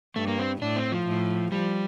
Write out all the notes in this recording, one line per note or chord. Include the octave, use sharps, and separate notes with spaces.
G2 A3
A#3
C4
A2 D4
C4
F3
A2
F3 G3